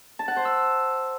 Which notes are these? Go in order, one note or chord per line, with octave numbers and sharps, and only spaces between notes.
A5
F#5
C5
E6